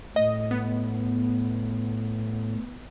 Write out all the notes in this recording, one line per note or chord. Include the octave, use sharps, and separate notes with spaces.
A2 D#5
B3